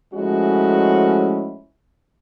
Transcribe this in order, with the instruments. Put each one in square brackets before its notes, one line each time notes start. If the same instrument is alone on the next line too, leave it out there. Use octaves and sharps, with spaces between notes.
[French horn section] F3 G#3 A3 C#4 E4 F#4